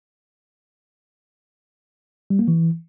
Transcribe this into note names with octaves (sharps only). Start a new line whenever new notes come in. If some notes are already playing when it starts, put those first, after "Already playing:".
G3
A#3
E3